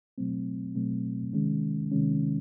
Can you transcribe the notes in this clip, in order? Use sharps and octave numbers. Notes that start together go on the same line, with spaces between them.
B2 F#3 A3 C4
B2 F#3 A3 C4
C3 D#3 G#3 C#4
C3 D#3 G#3 C#4